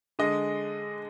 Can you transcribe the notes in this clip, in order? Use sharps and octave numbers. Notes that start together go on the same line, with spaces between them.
D3 G#3 D#5